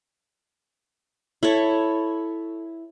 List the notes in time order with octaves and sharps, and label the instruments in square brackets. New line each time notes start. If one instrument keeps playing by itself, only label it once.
[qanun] E4 A4 C#5